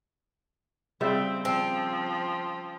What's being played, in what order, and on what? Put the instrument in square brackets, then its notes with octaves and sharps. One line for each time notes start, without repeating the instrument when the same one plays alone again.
[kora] C#3 G3 E5 [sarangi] C4
[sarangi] F3 [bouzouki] C4